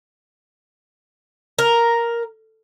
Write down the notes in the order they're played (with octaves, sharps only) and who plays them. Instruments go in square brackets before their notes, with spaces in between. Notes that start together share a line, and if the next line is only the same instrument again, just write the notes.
[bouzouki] A#4